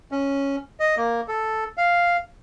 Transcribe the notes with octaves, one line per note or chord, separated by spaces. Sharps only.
C#4
D#5
A#3
A4
F5